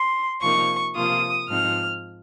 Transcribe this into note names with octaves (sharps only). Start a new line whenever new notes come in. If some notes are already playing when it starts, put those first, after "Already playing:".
Already playing: C6
C3 F3 A#3 D#4 C#6
C3 F3 A#3 F4 D#6
G#2 F3 C4 D#4 F6